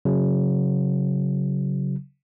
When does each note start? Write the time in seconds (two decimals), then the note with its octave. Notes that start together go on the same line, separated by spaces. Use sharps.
0.05 C#3 F#3